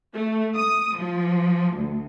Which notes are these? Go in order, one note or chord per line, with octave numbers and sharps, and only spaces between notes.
A3
D#6
F3
D2